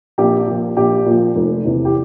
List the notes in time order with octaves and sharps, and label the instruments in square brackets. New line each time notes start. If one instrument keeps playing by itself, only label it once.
[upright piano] A#1 G4
A#2 F3
A#1 G4
A#2 F3
F1
E2 C3 E3
G4